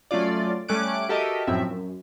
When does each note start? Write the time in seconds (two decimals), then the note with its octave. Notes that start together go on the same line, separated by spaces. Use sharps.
0.11 F#3 A3 C#4 F4 D5
0.68 G3 A3 C#4 D6 F#6 D7
1.09 F#4 G4 A4 A#4 D#5 E5
1.47 F#2 A2 F3 C4 E5
1.71 F#2